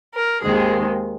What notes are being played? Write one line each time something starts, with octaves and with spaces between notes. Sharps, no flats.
A#4
D#2 D#3 G#3 C4 G#4